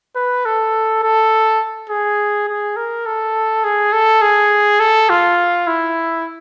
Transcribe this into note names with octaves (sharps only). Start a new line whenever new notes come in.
B4
A4
A4
G#4
G#4
A#4
A4
G#4
A4
G#4
A4
F4
E4